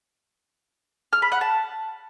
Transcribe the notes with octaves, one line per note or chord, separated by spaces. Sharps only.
F6
B5
F#5
A5